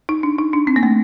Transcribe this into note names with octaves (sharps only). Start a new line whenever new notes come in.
D#4
D4
D#4
D4
C4
A#3
A3